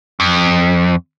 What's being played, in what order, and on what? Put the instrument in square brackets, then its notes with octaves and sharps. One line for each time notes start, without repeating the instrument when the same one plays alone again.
[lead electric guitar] F2